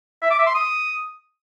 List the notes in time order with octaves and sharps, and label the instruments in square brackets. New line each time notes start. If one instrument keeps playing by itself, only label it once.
[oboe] E5
D6
E5
C6
D#6